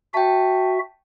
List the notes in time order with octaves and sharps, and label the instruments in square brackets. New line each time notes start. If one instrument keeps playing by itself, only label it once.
[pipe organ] F#4 E5 [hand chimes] G5 A5